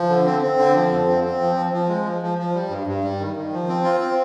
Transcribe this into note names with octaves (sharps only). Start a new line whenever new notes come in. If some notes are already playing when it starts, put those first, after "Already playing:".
Already playing: F3
D3
C4
C4
D3
F3
F2
C4
C4
F3
F3
F3
G#3
F3
F3
F3
G3
G2
G2
G3
D#3
D#3
F3
C4
F4
C4